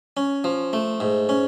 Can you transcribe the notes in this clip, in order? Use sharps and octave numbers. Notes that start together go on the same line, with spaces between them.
C#4
F3
A3
G#2
C#4